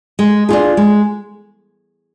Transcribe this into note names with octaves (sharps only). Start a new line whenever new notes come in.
G#3
D4 F4 G#4
G#3